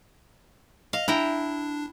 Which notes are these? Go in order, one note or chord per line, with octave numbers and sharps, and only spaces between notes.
D#5 F5
D4 E4 G5 A#5